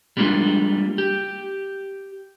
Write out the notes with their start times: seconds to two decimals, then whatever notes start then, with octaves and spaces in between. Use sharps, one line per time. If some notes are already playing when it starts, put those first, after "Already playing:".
0.17 G3 G#3 A#3 D4 F4
0.98 G4